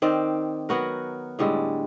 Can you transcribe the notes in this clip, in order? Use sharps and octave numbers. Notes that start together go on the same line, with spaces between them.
D#3 C4 D5
F#3 B3 F#4 A#4
A2 D3 G3 G#3